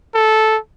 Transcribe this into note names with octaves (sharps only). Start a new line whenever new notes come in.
A4